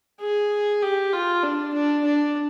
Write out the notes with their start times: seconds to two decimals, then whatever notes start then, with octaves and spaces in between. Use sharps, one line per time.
0.21 G#4
0.83 G4
1.13 F4
1.43 D4
1.74 D4
2.05 D4